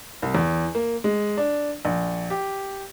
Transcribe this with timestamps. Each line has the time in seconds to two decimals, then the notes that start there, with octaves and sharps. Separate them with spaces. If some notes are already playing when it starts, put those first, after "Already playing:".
0.22 C2
0.35 E2
0.75 A#3
1.04 G#3
1.37 D4
1.85 A#1
2.30 G4